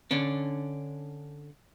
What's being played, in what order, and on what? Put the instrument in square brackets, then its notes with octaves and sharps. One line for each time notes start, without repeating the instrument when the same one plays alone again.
[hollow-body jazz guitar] D3 C#4 D4